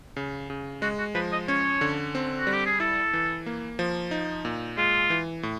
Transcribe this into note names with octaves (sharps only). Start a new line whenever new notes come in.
C#3
C#3
G#3 F#4
F#4
F3 B4
D#5
C#4 C#5
D3
C4
F#4
G3
G4
G#4
E4 A4
E3
A#3
F3
D#4
A#2
G#3 F4
E3
A2